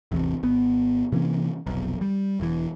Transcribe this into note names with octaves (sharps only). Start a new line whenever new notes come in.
A1 E2 A2 C3
G#1 B3
C3 E3 A#3 C#4
F1 B1
G3
E1 E3